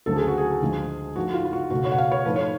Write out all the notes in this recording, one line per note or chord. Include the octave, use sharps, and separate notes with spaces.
D2 C#3 F#3 A3 A4
G#4
F#4
G#4
D2 D3 F3 G#3
G#2 F3 A3 F#4
F4
F4
F#4
C#2 B2 A3 F#4
C#5
F#5
F5
C#5
G#2 F3 A3 B4
C#5